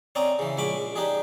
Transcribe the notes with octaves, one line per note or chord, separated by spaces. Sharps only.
C4 C#4 D5 D#5 A#5
C#3 E3
A#1 G#3 C#4 B5 D6
D4 D#4 G4 G#4